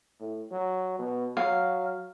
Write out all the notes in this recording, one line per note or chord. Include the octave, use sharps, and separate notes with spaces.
A2
F#3
B2
F#3 F5